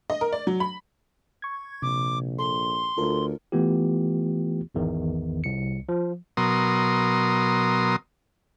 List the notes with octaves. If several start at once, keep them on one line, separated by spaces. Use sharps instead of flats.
D#5
A#4
D5
F#3
B5
C#6 G#6
A#1 C3 D6
A4 C6
D2 F4 A4 A#4
E3 A3 B3 F4 G4
G#1 E2 D#3
C2 C#7
F3
B2 F#3 A#4 C6 D#6